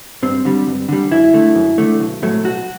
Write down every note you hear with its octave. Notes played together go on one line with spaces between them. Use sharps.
G2 C4
D3 G3
G2
D3 G3
F#2 E4
D3 A3
F#2
D3 A3
B1
A2 F#3 A3
B1 F#4